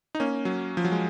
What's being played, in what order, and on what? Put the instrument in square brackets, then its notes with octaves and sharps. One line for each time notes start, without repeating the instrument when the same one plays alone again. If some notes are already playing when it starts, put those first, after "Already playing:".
[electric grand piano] D#4
A#3 C#4
F#3
F3
F#3
G#3